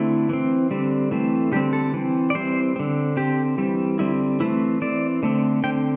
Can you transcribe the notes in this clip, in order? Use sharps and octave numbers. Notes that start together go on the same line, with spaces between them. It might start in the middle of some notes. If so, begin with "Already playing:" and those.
Already playing: D3 A3 C4 E4
E3 C4
D3 G3 C4
E3 A3 C4
D3 G3 C4 G4
A4
E3 C4
D5
E3 G3 C4 C5
D3 C4
D3 C4 G4
E3 G3 C4
D3 G3 C4 E4
E3 A3 C4 E4
E3 C4 D5
D3 A3 C4
D3 C4 G5